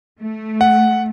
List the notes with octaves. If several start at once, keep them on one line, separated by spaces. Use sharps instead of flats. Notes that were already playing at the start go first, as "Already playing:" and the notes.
A3
F#5